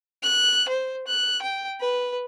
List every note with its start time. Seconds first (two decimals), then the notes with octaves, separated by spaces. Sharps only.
0.23 F#6
0.69 C5
1.07 F#6
1.42 G5
1.80 B4